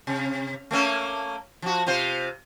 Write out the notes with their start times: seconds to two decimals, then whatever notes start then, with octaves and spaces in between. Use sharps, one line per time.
0.07 C3
0.71 A3 A#3 C#4
1.62 F3 F#4
1.86 C3 F4 C5